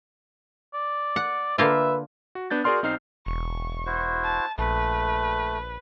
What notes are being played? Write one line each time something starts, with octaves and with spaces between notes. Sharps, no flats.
D5
F#5
D3 A#3 F4 B4 E5
F#4
B3 D4 G6 A6
F#4 G#4 A#4 D5 C6 F6
B1 C4 D#4 C5 F6 C7
E1 C#6
E4 F#4 C5
A5
A#1 A3 B4